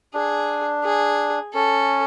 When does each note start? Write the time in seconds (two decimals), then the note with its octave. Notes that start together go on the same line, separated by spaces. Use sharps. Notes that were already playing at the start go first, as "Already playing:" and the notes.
0.14 D4 G#4
0.84 G#4
1.54 C#4 A4